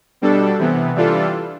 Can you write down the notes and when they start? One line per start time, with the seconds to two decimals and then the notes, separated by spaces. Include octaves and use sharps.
0.22 B2 G3 D4 A4
0.59 C3 E3 B3
0.95 E3 G3 D4 F4 A4